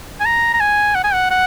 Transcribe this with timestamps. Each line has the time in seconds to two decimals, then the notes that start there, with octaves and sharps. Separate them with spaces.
0.20 G#5
0.25 A#5
0.54 A#5
0.60 G#5
0.95 F#5
1.04 G#5
1.13 F#5
1.31 F#5